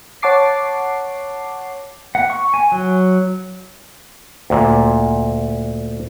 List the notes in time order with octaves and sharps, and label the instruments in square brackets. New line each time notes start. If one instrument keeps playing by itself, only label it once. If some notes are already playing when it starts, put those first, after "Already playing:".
[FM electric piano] C#5 F#5 A5 D6 C7
[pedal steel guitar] F#5
C#6
G#5
F#3
[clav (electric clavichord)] D2 A#2